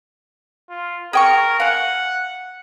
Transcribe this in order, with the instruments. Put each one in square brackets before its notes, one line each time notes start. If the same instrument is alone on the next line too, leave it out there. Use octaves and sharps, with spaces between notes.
[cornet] F4
[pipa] G#4 G5 C#6 [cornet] A#4
[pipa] F5 G#5 [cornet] F#5